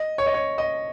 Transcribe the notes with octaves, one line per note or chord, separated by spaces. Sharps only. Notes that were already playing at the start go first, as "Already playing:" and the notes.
Already playing: D#5
C#5
D#5
C#5
D#5